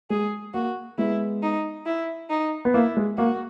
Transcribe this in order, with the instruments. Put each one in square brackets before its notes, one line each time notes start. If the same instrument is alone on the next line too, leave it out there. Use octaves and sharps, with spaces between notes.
[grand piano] G#3 [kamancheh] G#4
[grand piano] A#3 [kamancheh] F#4
[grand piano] G#3 B3 [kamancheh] E4
[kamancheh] D#4
E4
D#4
[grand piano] B3
[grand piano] A#3 [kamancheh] E4
[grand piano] G#3
[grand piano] A#3 [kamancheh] F#4